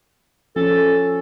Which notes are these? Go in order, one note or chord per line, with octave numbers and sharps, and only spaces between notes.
F3 C#4 A4